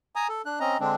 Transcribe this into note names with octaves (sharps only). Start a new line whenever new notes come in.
G#5 A#5 D#6
A4
D4 F#6
C4 C#4 D#5 A#5
D3 G#3 C4 D4